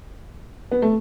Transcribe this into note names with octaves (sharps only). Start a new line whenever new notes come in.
B3
A3